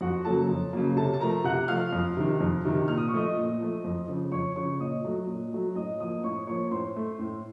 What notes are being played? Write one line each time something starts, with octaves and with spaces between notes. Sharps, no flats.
F2 F#4 F#5
C#3 F#3 A#3 A4 A5
F2
C#3 F#3 A#3
C3 A4 A5
A5
F3 A3 A#4 A#5
C3 F#5 F#6
F3 A3 F5 F6
F2
C3 D#3
F2
C3 D#3
A#2 F6
D#6
C#6
F3 A3 D#5 D#6
A#2
F3 A3
F2
C#3 F3
F2 C#5 C#6
C#3 F3 C#5 C#6
A#2 D#5 D#6
F#3 A3
A#2
F#3 A3
A2 D#5 D#6
F3 A#3 D#5 D#6
A2 C#5 C#6
F3 A#3 C#5 C#6
A2 C5 C6
A3
A2